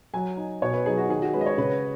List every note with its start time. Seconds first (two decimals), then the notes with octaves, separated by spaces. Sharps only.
0.14 F#3 G#5
0.37 D#4
0.62 B2 C#5
0.74 B4
0.86 F#3 D#4 G#4
0.97 F#4
1.09 D#3 G#4
1.22 F#4
1.33 G#3 C#4 B4
1.41 D#5
1.46 C#5
1.58 C#3 B4